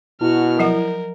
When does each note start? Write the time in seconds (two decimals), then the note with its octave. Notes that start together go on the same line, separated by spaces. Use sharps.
0.21 B2 E4 F#4 F6
0.59 F3 F#3 A#4 F#5